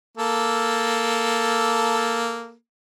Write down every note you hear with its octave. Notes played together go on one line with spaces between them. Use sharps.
A#3 A4